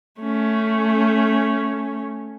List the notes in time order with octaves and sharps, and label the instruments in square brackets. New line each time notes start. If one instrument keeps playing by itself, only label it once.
[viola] A3 C#4